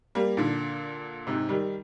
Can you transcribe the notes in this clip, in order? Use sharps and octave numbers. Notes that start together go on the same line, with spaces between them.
G3 A#3
A#2 D3
G#2 C3
D#3 G3